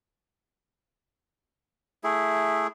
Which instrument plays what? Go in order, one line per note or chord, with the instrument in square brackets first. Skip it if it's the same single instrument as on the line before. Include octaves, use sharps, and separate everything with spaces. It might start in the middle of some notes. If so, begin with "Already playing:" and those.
[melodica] A3 E4 G#4